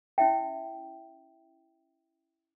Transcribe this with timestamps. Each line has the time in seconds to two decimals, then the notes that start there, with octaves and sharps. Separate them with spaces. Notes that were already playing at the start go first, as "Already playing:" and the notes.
0.18 C#4 E4 E5 G5